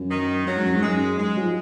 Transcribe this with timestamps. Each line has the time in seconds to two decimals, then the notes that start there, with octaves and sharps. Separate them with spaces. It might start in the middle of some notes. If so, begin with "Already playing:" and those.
Already playing: F#2
0.10 D#3
0.46 F#2 F#3
0.56 G#2
0.65 F#2
0.75 G#2
0.82 F#2 G#3
1.17 G#2 G#3
1.37 F#3
1.44 F3